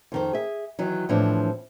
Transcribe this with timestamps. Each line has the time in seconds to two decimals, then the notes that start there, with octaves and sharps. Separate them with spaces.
0.12 F2 D#3 C5
0.33 G#4 E5
0.79 D#3 E3 F#3
1.09 A2 E3 F3 C4 D4